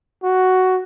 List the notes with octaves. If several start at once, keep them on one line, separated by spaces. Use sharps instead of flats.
F#4